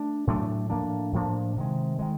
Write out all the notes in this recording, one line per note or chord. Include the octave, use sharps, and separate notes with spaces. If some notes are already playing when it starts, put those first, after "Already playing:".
Already playing: A3 D4
A2 F#3 A3 D4
A2 F3 A#3 D4
A2 F3 A#3 D4
C3 D#3 G#3
D#3 G#3